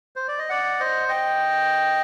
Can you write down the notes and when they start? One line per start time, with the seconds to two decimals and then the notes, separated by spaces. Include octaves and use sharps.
0.16 C5
0.28 D5
0.39 D#5
0.50 D5 F#5
0.80 C5 D#5
1.09 D#5 G5